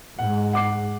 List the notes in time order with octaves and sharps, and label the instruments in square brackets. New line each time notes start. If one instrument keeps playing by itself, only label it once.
[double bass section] G#2 [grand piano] F#5
[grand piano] F#5 D6 C7